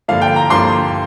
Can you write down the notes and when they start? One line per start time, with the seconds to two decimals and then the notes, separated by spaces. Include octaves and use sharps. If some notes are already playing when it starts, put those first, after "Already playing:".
0.08 G2 D3 F3 A#3 F5
0.22 G5
0.36 A#5
0.50 G2 D3 F3 A#3 C6